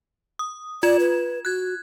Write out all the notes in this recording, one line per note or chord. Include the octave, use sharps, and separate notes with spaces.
D#6
F4 D5 G#6 E7
B4
F#4 F#6 G#6